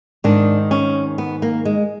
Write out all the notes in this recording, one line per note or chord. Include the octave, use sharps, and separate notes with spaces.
G#2 D#3 D4
C#4
B3
A#3
G#3